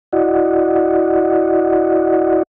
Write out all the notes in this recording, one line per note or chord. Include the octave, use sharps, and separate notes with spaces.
E4 F#4 D5 D#5 F#5